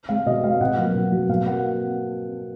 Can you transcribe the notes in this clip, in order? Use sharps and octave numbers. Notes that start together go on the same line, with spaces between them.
G#3 F5
B2 D#5
G#3 F5
B2 F#5
F#3 A#3
B2
F#3 A#3
B2 F5
A#3 F#5